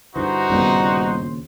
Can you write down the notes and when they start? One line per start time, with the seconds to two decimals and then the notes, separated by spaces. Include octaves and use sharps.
0.16 G2 D3 E3 D#4 F#4 C5
0.50 G1 D#2 A#2 C#3 G3 B3